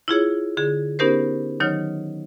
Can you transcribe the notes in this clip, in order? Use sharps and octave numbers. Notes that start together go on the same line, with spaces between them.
E4 F4 G#4 C#5
D3 G#4
B3 C#4 D#4 G4 A#4 C5
D#3 F#3 D#4 C#5 F6